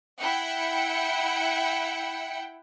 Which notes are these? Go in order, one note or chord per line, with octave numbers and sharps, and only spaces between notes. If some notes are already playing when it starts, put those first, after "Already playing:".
E4 F#5 G5 C#7